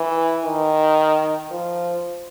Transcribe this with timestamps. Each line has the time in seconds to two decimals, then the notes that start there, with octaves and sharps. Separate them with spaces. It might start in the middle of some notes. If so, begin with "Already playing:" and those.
Already playing: E3
0.44 D#3
1.51 F3